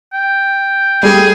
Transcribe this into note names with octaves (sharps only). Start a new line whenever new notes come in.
G5
G3 A3 G4 G#4